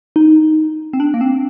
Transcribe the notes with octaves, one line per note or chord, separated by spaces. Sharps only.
D#4
C4
D4
A#3
C4